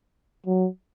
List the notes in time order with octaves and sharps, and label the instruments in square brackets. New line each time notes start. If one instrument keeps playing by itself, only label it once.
[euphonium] F#3